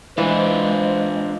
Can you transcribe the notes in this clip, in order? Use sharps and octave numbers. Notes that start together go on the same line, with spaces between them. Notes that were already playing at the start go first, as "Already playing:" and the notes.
E3 G#3 D4 F4 C5